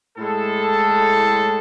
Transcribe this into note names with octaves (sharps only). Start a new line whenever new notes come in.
A2 G#3 A4